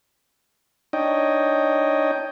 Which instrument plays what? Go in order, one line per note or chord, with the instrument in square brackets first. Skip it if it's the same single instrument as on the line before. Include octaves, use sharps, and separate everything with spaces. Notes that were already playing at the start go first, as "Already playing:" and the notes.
[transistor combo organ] D4 D#4 C#5 D#5 G5